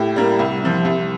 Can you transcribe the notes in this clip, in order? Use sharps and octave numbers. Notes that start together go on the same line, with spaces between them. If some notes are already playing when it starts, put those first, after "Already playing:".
Already playing: A2 G4
G3 A#3
C2
C3 F3
C2